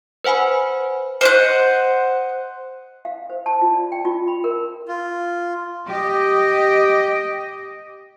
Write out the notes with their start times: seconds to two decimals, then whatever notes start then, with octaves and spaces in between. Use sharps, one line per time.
0.24 B4 C5 F#5 G#5 B5
1.21 C5 D#5 F#5
3.05 F5
3.30 C5
3.46 A5
3.61 F4
3.74 D5
3.92 G5
4.05 F4
4.28 B5
4.44 A#4
4.88 F4
5.87 G4 D#5